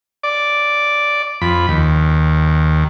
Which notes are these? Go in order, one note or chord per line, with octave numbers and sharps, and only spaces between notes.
D5
F2 B5
D#2